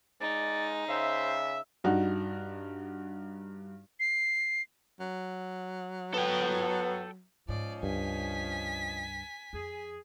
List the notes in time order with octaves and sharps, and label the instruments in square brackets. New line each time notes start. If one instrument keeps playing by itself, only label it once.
[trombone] G#3 [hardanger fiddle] D#4 [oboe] D5
[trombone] C#3 [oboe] C5 [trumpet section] E5
[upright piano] G2 D#4 F#4
[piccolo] C7
[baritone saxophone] F#3
[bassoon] B3 [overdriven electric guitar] A4 G5
[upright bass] G#2 [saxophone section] F3 C#4 D#5 [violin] D5
[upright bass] C#2 [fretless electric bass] G2 [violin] G#5 B6
[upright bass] F2 [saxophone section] G#4